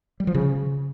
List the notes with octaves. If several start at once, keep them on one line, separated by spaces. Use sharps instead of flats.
G3
F3
C#3